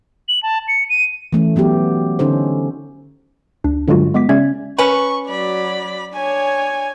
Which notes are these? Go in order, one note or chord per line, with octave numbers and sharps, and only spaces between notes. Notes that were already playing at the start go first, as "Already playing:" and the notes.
F#7
A5
C#7
D#7
E3 A3 C#4
F#3 B3 F#4 G4
D3 C#4 D#4 A4 C5
D2 D4
G2 D3 F#3 G#3 F4 F#4
G#3 B3 D6 B6
C#3 G#3 C#4 D5 E5 G#6
C#4 B4 C#6
F#3 D5 B5
D4 C#5 G#5